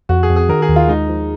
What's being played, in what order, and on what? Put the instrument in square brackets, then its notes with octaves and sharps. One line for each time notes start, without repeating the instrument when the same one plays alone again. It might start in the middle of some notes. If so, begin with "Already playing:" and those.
[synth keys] F2 [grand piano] F#4
[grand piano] G#4
[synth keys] F2
[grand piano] G#4
[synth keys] D#3 [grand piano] A#4
[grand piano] G#4
[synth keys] D#2
[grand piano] F4
[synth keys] G#3 [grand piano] D#4
[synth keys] F3